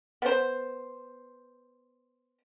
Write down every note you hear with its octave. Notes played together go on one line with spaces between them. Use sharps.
B3 C5